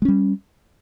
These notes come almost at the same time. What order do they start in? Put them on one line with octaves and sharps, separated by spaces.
G#3 C#4 G3